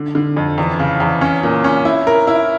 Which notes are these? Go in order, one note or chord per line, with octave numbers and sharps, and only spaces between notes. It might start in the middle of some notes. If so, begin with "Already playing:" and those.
Already playing: D3
D3
F2
E2
C#3
E2
C#4
A#2
C#4
E4
A#4
E4